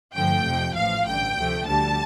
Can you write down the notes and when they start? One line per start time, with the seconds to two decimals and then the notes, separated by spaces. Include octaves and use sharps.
0.14 G2 D3 F3 A3 G5
0.44 F2 C3 F3
0.75 A1 A2 F3 F5
1.06 A1 G2 D3 G5
1.37 D2 C3 F3 A3
1.67 D2 D3 G3 A5